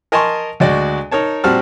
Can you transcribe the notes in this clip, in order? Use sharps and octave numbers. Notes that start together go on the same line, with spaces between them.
A#4 D#5 G#5 A5 C6 C#6
D2 G#3 F#4 D5 D#5
D#4 A#4 C#5 A5
A#2 G3 C4 F#4 A5 F6